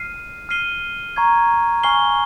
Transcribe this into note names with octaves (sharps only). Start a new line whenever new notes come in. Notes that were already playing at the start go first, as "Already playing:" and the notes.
Already playing: F6 C7 D#7
F6 C7 D#7 G7
A#5 C#6 G#6 C7
G#5 C#6 F6 C7 G7